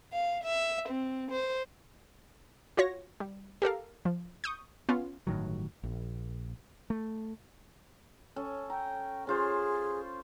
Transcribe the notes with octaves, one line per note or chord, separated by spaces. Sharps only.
F5
E5
C4
C5
F4 F#4 C#5 A#6
G3
G4 A4 A#4 F5
F3
C#6 D#6 G6
B3 C#4 F4
G1 A2 D#3 F#3
A#1
A3
C#4 A4
G5 A#5
C#4 F4 G#4 C5